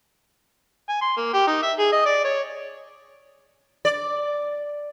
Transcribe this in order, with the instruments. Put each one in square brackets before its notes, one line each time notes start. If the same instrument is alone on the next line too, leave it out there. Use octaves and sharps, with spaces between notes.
[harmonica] G#5
C6
A#3
G4
D#4
E5
G#4
D#5
D5
C#5
[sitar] D5